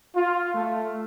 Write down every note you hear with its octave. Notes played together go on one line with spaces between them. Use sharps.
F4
A3